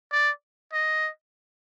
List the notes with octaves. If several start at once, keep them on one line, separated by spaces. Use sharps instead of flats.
D5
D#5